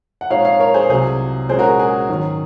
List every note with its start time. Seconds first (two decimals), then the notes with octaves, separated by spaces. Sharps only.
0.21 F#5
0.30 A#2 G#3 C4 D#4 C#5 F5
0.45 C#5 F5
0.59 A#4 C#5
0.74 G#4 C5
0.89 C2 C3 F#3 G#4 C5
1.49 A#2 G#3 C#4 G#4 C5
1.59 F#4 A#4
1.69 G#4
1.79 G#4
2.09 G#2 D#3 F#3 C#4